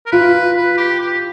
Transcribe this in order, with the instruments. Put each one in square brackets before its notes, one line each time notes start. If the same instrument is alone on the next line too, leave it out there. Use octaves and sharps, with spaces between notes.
[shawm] A#4
[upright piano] F4 [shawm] B4
[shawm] B4
G4
G4